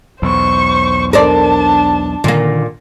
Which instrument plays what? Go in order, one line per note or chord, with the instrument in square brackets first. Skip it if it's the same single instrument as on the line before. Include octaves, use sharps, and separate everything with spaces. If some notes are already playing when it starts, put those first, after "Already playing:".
[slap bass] B1 E2 [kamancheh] C5 C#6
[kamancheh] D4 A5 [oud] A#4 C5 D5
[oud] A#2 A#3 [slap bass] D3 D#3